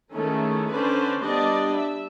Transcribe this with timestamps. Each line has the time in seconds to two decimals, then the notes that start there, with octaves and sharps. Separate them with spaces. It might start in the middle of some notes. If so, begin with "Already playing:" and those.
0.14 D#3 G#3 A3 C#4 E4
0.73 D3 C#4 B4 C5 D5
1.23 G3 B3 D4 D5 D#5
1.77 E5